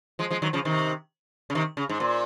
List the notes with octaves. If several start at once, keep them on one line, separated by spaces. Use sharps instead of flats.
F3 G#3
F3 G#3
D#3 F#3
C#3 F3
C3 D#3
C#3
C3 D#3
C#3
G#2
A#2